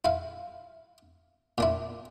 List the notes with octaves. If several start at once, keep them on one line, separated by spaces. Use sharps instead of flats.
E4 F5
A#2 D4 E4